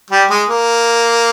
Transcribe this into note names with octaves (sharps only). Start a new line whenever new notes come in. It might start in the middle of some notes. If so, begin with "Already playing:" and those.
G3
G#3
A#3